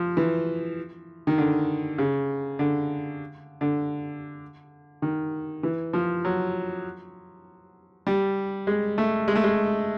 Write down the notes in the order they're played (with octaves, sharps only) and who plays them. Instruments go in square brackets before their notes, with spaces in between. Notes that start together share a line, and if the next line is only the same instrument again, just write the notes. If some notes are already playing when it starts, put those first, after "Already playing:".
Already playing: [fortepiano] F3
E3
D#3
D3
C#3
D3
D3
D#3
E3
F3
F#3
G3
G#3
A3
G#3
A3
G#3